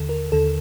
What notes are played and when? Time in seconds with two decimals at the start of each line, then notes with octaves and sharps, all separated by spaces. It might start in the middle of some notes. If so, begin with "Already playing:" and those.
Already playing: D#2 D3 A4
0.09 A#4
0.32 D#2 D3 A4